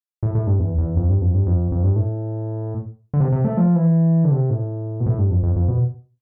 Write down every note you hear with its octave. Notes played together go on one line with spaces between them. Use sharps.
A2
A2
G2
E2
E2
F2
G2
F2
G2
F2
F2
G2
A2
D3
C3
C3
A3
F3
E3
D3
C3
A2
B2
A2
G2
F2
F2
F2
B2